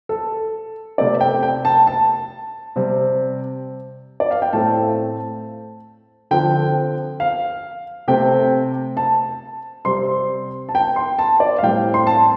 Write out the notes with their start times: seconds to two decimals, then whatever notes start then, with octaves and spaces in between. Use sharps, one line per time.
0.09 A4
0.98 C3 A3 C4 D5
1.20 G5
1.43 G5
1.65 A5
1.87 A5
2.76 C3 G3 C4
4.20 D5
4.31 F5
4.42 G5
4.53 A2 A3 C4 A5
6.31 D3 F3 C4 G5
7.20 F5
8.08 C3 A3 C4 G5
8.97 A5
9.85 C3 G3 C4 C6
10.69 A5
10.75 G5
10.96 C6
11.19 A5
11.40 D5
11.58 F5
11.63 A2 G3 C4 G5
11.94 C6
12.07 A5